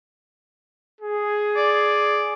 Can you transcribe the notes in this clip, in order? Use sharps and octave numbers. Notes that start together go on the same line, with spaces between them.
G#4
D5